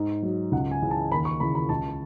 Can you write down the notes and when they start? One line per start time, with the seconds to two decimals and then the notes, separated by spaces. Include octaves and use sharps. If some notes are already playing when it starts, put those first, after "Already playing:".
Already playing: G#2
0.23 F#3
0.52 C#2 F#5
0.71 G#5
0.82 C#3 E3
0.91 A5
1.11 D#2 B5
1.25 C#6
1.40 C#3 E3 B5
1.55 B5
1.69 C#2 A5